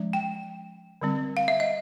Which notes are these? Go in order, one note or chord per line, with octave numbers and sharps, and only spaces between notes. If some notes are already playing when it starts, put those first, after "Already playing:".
Already playing: F3 G#3 C#4
G5
D3 G3 C4
F5
E5
D#5